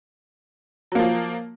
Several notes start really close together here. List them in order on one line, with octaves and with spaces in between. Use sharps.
F#3 A#3 F3